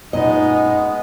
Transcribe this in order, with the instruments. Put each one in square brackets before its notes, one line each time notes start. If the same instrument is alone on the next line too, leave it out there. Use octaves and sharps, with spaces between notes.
[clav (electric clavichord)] F#2 A#2 [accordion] G#3 B3 [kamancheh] D#4 [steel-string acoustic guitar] D#5